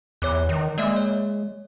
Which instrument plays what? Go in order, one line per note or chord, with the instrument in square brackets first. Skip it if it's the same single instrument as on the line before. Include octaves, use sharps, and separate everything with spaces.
[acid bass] E2 [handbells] C#5 D6 F#6
[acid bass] D#3
[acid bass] G#3 [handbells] A#3 D5 E5
[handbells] C#5